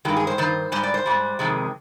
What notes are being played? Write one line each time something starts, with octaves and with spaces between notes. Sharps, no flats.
G2 D#3 G#3 G4
G#4
C5
G2 D#3 C5
G#2 G3 C5
D5
C5
G#2 G3
F2 C3 D#3 G#3